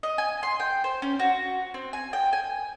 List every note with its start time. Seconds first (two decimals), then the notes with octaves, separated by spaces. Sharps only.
0.03 D#5
0.18 G#5
0.43 C6
0.60 G5
0.84 C5
1.02 C#4
1.19 F#4
1.74 C4
1.93 G#5
2.13 G5
2.33 G#5